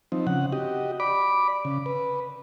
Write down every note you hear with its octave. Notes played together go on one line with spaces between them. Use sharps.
F3 C4 D#4
C#3 F#5
F#4 G4 D#5
D5 B5 D6
C#3
B4